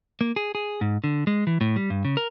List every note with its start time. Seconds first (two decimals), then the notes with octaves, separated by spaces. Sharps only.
0.21 A#3
0.36 G#4
0.55 G#4
0.81 G#2
1.04 D3
1.27 G#3
1.47 E3
1.61 A2
1.76 G3
1.90 G2
2.05 C#3
2.17 A#4